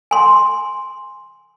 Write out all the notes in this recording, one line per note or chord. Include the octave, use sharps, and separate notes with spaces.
G#5 C6